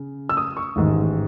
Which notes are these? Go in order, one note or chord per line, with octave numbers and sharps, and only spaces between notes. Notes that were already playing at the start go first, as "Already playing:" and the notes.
Already playing: C#3
E6
D#6
C#6
A1 G#2 D#3